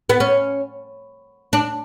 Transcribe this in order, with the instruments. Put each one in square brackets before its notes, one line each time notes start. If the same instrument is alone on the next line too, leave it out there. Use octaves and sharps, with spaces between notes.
[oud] B3
C#4
D4